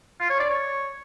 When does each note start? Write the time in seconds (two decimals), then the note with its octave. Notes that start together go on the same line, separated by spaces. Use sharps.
0.20 F4
0.30 C#5
0.40 D5
0.50 C#5